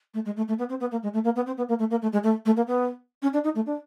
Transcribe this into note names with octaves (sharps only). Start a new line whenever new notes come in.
A3
G#3
A3
A3
B3
C4
B3
A#3
G#3
A3
A#3
B3
C4
B3
A#3
A3
A#3
A3
G#3
A3
A3
A#3
B3
C#4
D4
D#4
A3
D4